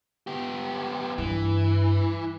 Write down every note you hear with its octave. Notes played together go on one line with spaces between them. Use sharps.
B3 G4
G2 E3